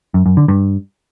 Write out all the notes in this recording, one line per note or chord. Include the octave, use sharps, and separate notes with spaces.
F#2
F#2
D3
G2